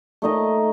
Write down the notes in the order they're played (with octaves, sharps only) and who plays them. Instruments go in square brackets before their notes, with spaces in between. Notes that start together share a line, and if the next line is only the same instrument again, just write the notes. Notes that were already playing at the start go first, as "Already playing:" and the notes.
[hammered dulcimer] A3 D#4 A#4 D#5